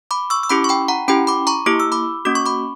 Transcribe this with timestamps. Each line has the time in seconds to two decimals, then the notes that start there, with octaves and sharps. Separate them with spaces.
0.11 B5 D6
0.30 C#6 E6
0.43 E6
0.49 C#4 E4 G4 B5 D6
0.64 C#6
0.69 G5 B5
0.88 F#5 A#5
1.08 C#4 E4 G4 G5 B5
1.27 B5 D6
1.47 A#5 C#6
1.66 A#3 E4 G4 D6
1.80 E6
1.92 B5 D6
2.25 A#3 C#4 F#4 D6
2.35 C#6
2.46 B5 D6